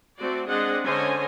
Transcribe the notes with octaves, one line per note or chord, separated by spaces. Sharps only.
A3 C4 F#4 D5
G#3 C4 D4 D#5 F#5
D3 C#4 C5 C#5 D#5 G#5